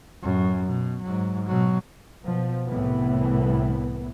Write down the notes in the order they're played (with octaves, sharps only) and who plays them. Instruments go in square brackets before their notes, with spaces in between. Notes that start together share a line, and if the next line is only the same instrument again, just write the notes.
[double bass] F#2 A2
B2
G#2 F#3
B2 F#3
[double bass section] B2 F3
C2 A2 E3 B3